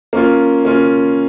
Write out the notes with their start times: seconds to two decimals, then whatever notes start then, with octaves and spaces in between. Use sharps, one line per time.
0.13 A#3 C#4 F4
0.65 A#3 C#4 F4